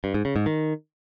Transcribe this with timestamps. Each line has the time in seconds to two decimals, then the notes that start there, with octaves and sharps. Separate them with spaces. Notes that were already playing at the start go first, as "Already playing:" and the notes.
0.04 G2
0.14 G#2
0.25 C#3
0.36 G#2
0.46 D#3